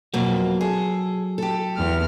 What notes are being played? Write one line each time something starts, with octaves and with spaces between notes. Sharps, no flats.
F2 B2 F#3 A#3
G#4 A4
G4 A4
E2 F6